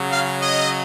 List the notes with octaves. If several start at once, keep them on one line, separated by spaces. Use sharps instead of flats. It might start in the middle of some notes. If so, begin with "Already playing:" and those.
Already playing: C#3 F#3
F5
D#5